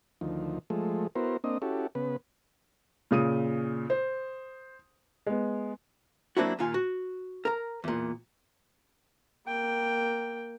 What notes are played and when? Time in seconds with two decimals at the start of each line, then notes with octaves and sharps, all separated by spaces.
0.21 D2 D#3 F3
0.70 F3 G#3 A3
1.15 B3 E4 F#4 A#4 C5
1.44 A#3 C4 D4 D#5
1.62 C#4 E4 F#4 G4 A4
1.95 C#3 B3 B4
3.11 A#2 C#3 D#6 D#7
3.90 C5
5.27 G#3 B3
6.37 F#3 A#3 C4 D4 E4 F#4
6.59 D#2 A#2 F4 G#5
6.74 F#4
7.45 A#4 A#5
7.84 E2 A#2
9.46 A#3 G5